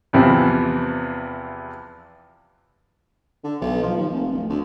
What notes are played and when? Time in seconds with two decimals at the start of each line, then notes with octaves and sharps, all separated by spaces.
0.13 E2 C3 E3 F3
3.44 D3
3.61 B1
3.83 F3
3.97 D#2
4.12 F1
4.31 D1
4.49 D2